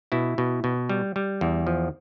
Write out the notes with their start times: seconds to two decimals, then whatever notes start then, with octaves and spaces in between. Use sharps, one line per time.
0.12 B2 E4
0.38 B2
0.64 B2
0.89 G3
1.16 G3
1.41 E2
1.67 F3